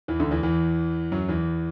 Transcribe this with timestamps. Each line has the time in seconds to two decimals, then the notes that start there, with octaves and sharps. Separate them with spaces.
0.08 E2 E3
0.20 D2 D3
0.31 E2 E3
0.43 E2 E3
1.12 F#2 F#3
1.28 E2 E3